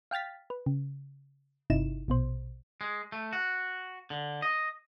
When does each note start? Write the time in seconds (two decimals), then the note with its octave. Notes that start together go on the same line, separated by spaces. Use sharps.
0.11 F5 G5 F6 A6 B6
0.50 B4
0.66 C#3
1.70 G1 C3 D#4 E4 E7
2.08 A#1 B2 C5
2.81 G#3
3.12 A3
3.33 F#4
4.10 D3
4.42 D#5